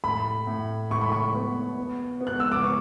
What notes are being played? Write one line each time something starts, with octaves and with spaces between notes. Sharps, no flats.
A2 B5
A2
A2 C#6
B5
C#6
B3
B3
B3
F#6
E6
D6
B3 C#6